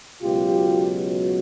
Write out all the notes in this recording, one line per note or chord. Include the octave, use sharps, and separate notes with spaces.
C#2 B2 F#3 F4 G4